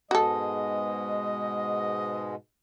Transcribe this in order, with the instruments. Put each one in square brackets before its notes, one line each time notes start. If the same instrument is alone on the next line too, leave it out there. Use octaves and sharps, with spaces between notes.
[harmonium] G#2 B2 G#3 [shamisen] F#4 A4 [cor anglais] D#5